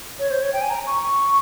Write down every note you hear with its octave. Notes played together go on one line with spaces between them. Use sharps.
C#5
C5
C#5
G5
G#5
A#5
C#6